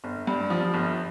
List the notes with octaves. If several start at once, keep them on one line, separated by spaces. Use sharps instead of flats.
G1
G2
F3
G1